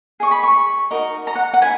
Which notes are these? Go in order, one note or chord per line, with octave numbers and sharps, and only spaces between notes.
G#4 D#5 C#6
B5
C#6
D#4 F#4 A#4 D#5
A#5
F#5
F#5
E4 G#5